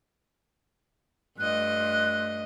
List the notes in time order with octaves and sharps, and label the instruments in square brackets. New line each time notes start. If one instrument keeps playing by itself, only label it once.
[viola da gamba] G2 A3 D#5 [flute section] F4 F#6